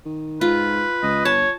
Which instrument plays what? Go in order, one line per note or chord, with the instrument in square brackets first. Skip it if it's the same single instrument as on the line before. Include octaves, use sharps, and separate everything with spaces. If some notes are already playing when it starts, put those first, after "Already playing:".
[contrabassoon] D#3
[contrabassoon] G#2 [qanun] F4 [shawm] B4
[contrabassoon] C#2 [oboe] D#5
[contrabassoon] G1 [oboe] C#5 [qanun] A5